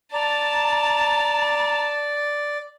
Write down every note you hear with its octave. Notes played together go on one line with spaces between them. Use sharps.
D5 A5 A#5